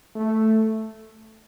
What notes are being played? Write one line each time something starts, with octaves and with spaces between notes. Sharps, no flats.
A3